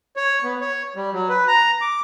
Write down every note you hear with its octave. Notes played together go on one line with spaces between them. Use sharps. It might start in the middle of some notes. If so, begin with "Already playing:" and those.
C#5
B3
C#5
G3
F#3
B4
A#5
D6